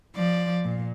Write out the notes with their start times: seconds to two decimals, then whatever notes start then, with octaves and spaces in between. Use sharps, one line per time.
0.15 F3 D5
0.64 A#2